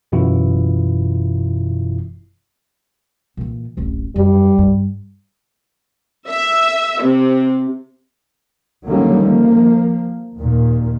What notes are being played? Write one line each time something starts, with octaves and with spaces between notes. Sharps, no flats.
G1 F#2 B2 E3 E4 F4
A#2 E3
D1 A1
F#2 G3
G2
E5
C3
D3 D#3 F#3 G3 A#3 C#4
F3 A#3
D#2 A#2 D#3